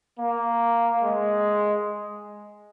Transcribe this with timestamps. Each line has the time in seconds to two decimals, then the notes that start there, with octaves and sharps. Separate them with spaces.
0.19 A#3
1.01 G#3